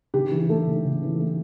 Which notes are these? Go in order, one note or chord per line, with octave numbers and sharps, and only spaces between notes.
C#3 G4
E3
A3 A4
C#3
C#3
E3
A3